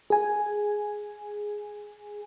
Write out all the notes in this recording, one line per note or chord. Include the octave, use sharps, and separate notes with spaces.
G#4 G#5